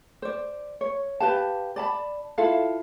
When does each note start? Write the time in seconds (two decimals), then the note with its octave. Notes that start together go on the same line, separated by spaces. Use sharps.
0.22 C5 D5
0.81 C#5
1.20 G4 B4 F5 A5
1.76 D5 A5 B5
2.38 E4 F4 A4 F5